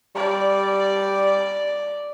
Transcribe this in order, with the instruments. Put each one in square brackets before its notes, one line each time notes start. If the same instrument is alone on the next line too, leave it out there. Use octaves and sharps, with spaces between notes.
[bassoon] G3 [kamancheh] D5